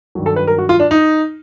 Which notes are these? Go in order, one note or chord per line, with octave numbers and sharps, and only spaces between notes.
G2 D#3 F#3
A4
B4
A#4
F#4
F4
D4
D#4